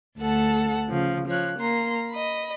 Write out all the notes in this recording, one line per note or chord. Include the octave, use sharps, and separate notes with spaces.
D2 A3 A4 F#5 A5
C#3 F3
F3 C#5 F#6
A#3 A#5 C6
D#5 B5